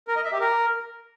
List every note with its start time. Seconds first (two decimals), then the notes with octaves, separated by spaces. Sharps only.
0.08 A#4
0.16 D#5
0.24 E5
0.32 G4
0.40 A#4